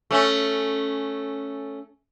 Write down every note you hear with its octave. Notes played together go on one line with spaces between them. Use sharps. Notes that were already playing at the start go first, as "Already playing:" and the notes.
A3 C#4